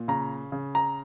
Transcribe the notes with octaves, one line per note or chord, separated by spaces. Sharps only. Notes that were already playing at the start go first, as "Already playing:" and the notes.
Already playing: A#2
C#3 A#5
C#3
A#5